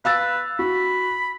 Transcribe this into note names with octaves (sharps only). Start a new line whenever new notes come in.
B4 F5 E6 A6
F#4 B5